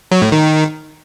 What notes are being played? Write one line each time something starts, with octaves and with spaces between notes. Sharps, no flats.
F#3
A2
D#3